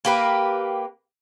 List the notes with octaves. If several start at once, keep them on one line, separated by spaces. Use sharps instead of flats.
A#3 G4 B4